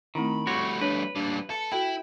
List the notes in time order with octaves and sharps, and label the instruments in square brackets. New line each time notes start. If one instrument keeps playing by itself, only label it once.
[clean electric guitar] D#3 [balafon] A3 C4 E4 [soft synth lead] B5
[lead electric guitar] G3 A3 [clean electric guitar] F#4 C#5 [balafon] C6
[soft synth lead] D4 [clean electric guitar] B4 [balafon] C#5
[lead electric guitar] A#2 G3 [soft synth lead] D4
[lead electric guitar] A4 [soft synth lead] C#7
[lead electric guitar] E4 [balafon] F#4 A4 B5 [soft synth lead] G5